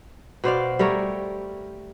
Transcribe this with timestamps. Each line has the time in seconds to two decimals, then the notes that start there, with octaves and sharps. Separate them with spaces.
0.44 B2 C5 D5 F5
0.79 G3 A3 A#4 C#5